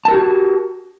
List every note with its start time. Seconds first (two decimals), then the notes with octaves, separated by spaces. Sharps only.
0.05 A5
0.08 A#4
0.11 G4
0.14 F#4